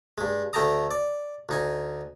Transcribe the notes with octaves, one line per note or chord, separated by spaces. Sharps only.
G2 G#3
D2 A3 G5 A5 A#5 D#6
D5
D2 D#4 G#5